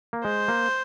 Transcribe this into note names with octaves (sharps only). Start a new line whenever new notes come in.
A#3
G#3 C5
A#3